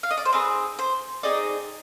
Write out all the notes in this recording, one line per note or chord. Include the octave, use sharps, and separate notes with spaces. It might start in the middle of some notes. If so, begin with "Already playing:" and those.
F5
D#5
D5
C5
C4 D#4 G#4 B4
C5
C4 D#4 G#4 D5